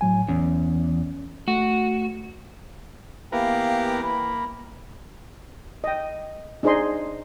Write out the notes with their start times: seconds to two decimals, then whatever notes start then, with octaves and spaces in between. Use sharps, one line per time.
0.01 A2 F#3 G#5
0.29 E2 C#4
1.48 A3 F#4
3.32 E3 A#3 B3 G4 A#4 F5
4.03 A#3 B5
5.84 D#5 G5
6.63 D4 D#4 G#4 C5 D#5 C6